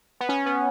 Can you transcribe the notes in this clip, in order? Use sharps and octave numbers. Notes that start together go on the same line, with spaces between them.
B3
C#4
B3